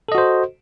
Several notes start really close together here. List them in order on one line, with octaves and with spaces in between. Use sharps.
A4 D#5 F#4 C5